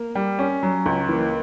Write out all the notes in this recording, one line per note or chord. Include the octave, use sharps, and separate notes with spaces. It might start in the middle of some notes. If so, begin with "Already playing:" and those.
Already playing: A#3
G3
C#4
F#3
C#2
E3 A#3